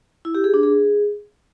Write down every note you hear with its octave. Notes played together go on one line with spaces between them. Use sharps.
E4
G4
G#4
D4
G#4